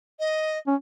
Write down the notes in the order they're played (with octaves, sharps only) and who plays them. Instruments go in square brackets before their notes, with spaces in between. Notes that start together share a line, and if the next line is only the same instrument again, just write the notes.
[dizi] D#5
[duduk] C#4